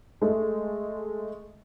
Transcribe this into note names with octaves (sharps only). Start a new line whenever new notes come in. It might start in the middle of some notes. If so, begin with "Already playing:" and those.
G#3 A3